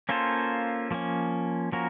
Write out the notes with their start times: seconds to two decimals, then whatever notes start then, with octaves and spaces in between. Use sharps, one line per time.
0.09 A#3 C#4 F4 A4 C5
0.91 F3 A#3 C#4
1.72 F3 A#3 C#4 F#4 A#4